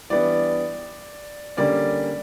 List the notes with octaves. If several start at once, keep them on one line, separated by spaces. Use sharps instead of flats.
E3 G3 B3 D4 D5
D3 G3 A#3 C#4 D5